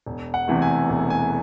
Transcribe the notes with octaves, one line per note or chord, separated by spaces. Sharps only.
E1
F#5
E2 C3 E3 A3
G#5
E1
G#5